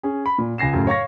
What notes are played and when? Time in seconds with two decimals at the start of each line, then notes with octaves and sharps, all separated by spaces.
0.03 C#4 G#4
0.26 B5
0.38 A#2
0.58 C#2 G#5 A#6 C7 E7
0.73 F#2 A2 C#3
0.87 C#5 F5 C#6 A#6